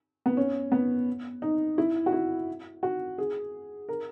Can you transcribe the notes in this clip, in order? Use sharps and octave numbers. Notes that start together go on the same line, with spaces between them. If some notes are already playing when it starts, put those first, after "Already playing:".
B3
C#4
B3
D#4
E4
F#4
E4
F#4
G#4
A#4